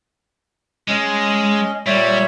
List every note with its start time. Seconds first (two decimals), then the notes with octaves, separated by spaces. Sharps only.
0.88 G#3 C#4 D#5
1.87 A#2 G3 C#5 E5